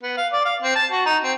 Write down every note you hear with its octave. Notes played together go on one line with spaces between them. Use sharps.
B3
F5
D5
F5
C4
A5
F#4
D#4
C4